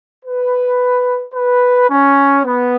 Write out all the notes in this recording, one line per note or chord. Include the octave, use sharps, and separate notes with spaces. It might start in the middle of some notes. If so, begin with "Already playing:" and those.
B4
B4
C#4
B3